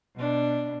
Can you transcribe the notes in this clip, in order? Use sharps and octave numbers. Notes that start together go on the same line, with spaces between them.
B2 D4